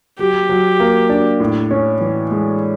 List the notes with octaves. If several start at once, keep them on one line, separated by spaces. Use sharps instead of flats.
F#3 G4
F#3
A#3
D4
A2
C#4
E3
G#3